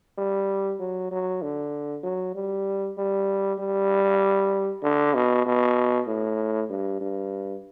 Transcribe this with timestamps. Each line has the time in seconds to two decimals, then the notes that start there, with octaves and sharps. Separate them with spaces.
0.18 G3
0.80 F#3
1.12 F#3
1.42 D3
2.04 F#3
2.35 G3
2.98 G3
3.59 G3
4.83 D3
5.14 B2
5.46 B2
6.07 A2
6.70 G2
7.01 G2